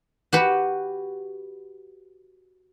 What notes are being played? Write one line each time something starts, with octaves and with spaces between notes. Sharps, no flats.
F#4 G4 B4